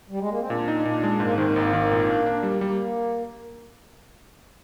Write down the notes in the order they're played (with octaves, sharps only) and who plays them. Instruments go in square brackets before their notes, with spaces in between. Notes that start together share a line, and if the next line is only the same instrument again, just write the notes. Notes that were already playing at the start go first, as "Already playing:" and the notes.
[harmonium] G3
G#3
A#3
C4
[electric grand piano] A#2 [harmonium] D4
[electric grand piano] D#4
[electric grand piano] A#2 [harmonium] D4
[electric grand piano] G#3
[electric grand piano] G#2 [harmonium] A#3
[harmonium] C4
[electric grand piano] D#3
[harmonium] A#3
[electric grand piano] G#1
D#3
A#2
D4
D4
G3
[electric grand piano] G3 [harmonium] A#3